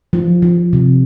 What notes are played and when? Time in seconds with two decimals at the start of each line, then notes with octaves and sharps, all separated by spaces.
0.13 F3
0.42 F3
0.73 C3